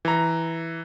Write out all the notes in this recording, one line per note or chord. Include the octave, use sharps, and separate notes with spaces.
E3 A#5